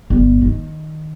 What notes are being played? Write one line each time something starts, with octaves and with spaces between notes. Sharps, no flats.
G1
D#3